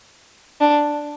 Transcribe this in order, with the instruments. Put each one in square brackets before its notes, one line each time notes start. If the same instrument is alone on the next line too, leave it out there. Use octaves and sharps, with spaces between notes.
[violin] D4